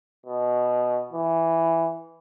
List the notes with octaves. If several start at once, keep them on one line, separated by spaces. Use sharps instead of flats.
B2
E3